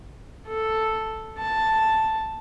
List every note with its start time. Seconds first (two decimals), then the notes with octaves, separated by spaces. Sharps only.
0.48 A4
1.39 A5